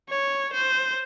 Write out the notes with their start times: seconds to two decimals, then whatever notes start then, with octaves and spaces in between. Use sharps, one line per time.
0.09 C#5
0.53 C5